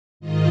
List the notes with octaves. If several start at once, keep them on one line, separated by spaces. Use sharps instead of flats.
G#2 D#3 F4 D#5